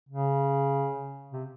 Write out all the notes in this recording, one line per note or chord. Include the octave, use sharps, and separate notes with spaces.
C#3
C3